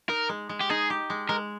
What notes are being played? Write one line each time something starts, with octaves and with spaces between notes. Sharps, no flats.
D#4 A#4
G#3
G#3
G4
D#4 G#4
G4
G#3
G#3 A#4